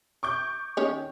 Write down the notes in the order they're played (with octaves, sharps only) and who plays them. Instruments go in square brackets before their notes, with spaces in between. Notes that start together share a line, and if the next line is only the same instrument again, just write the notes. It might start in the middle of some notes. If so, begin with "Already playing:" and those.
[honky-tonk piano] C#6 D6 G6
[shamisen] D#3 C#4 C#5